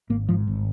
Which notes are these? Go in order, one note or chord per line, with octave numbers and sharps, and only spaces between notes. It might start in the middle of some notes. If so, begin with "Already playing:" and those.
G#1 A#3
G#2 F3
G#1